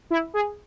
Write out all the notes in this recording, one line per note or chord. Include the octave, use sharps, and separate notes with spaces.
E4
G#4